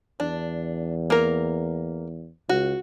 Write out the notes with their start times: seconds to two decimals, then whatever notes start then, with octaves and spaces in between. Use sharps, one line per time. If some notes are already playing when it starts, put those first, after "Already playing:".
0.20 E2 D4
1.10 A#3 A#4
2.49 C#2 F#4